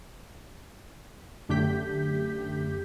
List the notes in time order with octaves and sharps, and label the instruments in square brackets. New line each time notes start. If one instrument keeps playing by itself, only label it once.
[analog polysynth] F#2 D3 A3 G4 G6 B6